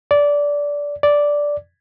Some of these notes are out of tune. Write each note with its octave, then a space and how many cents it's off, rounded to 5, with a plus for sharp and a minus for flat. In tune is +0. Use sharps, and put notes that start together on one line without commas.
D5 -15
D5 -5